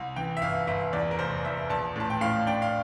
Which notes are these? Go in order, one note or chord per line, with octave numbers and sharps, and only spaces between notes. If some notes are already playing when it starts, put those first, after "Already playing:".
Already playing: C2
E3 G5
E5
G1 F5
G1 E5
E2 D5
A#4
F1 C5
E2 E5
A#1 A5
A2 A5
G5
A2 F5
D4 G5
F5